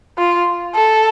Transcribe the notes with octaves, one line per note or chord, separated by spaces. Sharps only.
F4
A4